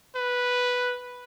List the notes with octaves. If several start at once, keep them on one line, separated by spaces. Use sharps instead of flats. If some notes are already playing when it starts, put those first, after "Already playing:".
B4